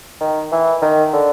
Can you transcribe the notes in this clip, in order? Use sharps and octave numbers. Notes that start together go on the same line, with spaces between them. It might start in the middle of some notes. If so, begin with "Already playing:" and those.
D#3
E3
D#3
D3